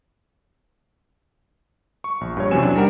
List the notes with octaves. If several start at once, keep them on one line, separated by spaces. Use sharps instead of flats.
C#6
A#1
G2 C#5
E2 C3 F#3 C#4 G#5 E7
D4
G3 D#4 A#4 F#5